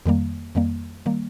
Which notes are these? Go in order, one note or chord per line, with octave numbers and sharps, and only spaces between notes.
F2 D#3 G3 A#3
F2 D#3 G3 A#3
D#3 G3 A#3